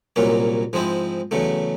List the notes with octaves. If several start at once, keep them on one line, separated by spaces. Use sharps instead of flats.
C2 A#2 F#3 A#3 C#4
G#2 F3 G#3 C4 E4
E2 C#3 F#3 A3